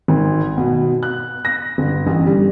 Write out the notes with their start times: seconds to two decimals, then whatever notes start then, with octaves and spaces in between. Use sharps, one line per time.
0.08 G#1
0.57 B2
1.03 F#6
1.45 A#6
1.78 G1
2.07 A1
2.26 G3